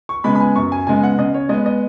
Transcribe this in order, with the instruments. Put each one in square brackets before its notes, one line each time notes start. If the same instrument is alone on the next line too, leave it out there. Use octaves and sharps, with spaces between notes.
[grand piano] C#6
C#3 G#3 B3 B5
B5
G#5
F#2 C#6
G#5
C#3 G#3 B3 G#5
F#5
C#3 D#5
C#5
G#3 B3 D#5
D#5